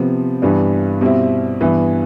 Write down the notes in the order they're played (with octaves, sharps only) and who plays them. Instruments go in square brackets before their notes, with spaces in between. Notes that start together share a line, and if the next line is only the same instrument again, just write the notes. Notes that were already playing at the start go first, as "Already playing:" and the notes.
Already playing: [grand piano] C3 F3 B3
G2 E3 G3 B3 D4
B2 G3 C4 E4
G2 E3 B3 E4